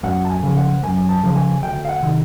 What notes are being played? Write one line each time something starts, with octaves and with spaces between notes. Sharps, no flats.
F#2 F#5
A5
G#5
C#3 F3
F#5
F#2 G#5
A5
C#3 F3
G#5
D2 G5
F5
F#5
C3 D#3